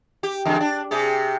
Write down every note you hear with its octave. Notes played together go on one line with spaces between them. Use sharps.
G4
E2 D3 G#3
D4
C3 G4 G#4